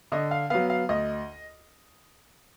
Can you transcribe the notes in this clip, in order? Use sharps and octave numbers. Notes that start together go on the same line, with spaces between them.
D3 D#5
F5
F#3 B3 F5
F5
D2 D#5